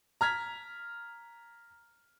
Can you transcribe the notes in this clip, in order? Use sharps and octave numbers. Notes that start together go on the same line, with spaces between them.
A#5 F6 G#6 B6